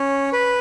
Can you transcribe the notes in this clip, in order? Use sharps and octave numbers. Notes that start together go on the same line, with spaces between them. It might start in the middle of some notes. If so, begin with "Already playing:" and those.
Already playing: C#4
B4